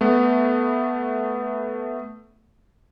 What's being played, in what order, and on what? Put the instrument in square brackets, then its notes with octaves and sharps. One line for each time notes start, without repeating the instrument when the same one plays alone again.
[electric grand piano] A3 B3